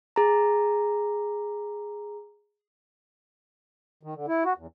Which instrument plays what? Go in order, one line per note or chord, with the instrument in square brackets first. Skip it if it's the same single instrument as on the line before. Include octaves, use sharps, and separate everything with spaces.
[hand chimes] G#4 A#5
[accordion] D#3
D3
E4
F#4
E2